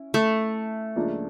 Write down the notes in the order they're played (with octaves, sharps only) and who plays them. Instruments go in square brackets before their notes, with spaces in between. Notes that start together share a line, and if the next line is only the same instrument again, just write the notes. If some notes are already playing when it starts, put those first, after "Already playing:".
Already playing: [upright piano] C#4 E4
[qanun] A3
[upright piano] C#2 C#3 F3 A#3 D4